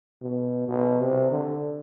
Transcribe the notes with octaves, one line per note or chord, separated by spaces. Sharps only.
B2
B2
C3
D3